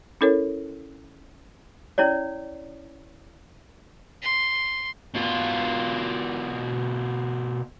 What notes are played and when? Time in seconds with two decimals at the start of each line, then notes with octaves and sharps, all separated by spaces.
0.21 C#4 E4 A4 A#4 C#5
1.98 C#4 E4 C#5 D5
4.22 C6
5.14 B2 F4